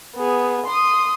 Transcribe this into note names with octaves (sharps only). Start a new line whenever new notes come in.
B3 G#4
C6 D#6